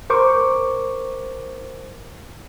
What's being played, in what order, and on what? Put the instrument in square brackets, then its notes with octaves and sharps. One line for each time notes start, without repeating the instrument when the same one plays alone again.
[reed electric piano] A#4 C5 C#6 D6